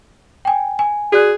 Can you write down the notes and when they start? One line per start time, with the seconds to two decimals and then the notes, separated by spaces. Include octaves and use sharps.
0.45 G5 G#5
0.79 G#5
1.13 F#4 G#4 D5 F#6